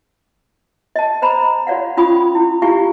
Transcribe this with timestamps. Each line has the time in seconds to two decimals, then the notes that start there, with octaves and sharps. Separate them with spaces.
0.96 D#5 A5
1.22 C5 A#5 B5
1.67 F#4 C#5 D5 F5 F#5
1.97 C#4 F4 F#4 B5 C#6 D#6
2.35 E4
2.62 E4 F4 G4 F5 G#5 C#6